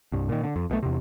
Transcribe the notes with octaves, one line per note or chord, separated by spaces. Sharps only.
C2 G2
A#2 D#3
D3
F2
B1 B2 D3 A3
E2 C3